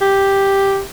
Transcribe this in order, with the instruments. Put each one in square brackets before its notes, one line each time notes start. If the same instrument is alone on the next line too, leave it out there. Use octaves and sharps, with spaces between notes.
[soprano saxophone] G4